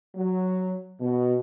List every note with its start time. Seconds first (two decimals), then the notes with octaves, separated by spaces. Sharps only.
0.15 F#3
1.00 B2